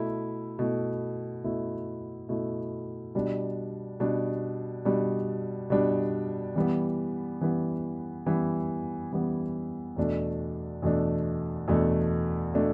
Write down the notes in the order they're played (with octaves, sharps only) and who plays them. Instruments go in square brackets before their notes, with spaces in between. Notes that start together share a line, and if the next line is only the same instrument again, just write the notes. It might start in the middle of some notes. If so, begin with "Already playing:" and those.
Already playing: [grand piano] B2 A3 E4
B2 A3 E4
B2 A3 E4
B2 A3 E4
B2 G3 D4
B2 G3 D4
B2 G3 D4
B2 G3 D4
E3 G3 B3
E3 G3 B3
E3 G3 B3
E3 G3 B3
E2 B2 A3 D4
E2 B2 A3 D4
E2 B2 A3 D4
B2 A3 D4